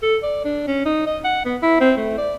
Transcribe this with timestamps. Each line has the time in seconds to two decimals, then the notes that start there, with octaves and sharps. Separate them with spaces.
0.03 A4
0.23 D5
0.45 D4
0.67 C#4
0.85 D#4
1.06 D#5
1.24 F#5
1.45 B3
1.62 E4
1.81 C4
1.97 A3
2.18 D5